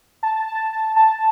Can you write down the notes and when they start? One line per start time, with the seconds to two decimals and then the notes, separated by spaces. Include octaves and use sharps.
0.23 A5
0.47 A5
0.73 A5
0.96 A5